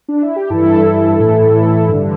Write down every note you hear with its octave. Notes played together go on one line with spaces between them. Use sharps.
D4
E4
G4
G2 E3 E4 A4
A2 E3
G2 D3